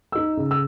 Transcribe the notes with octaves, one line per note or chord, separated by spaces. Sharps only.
D#4 E6
C#3
E6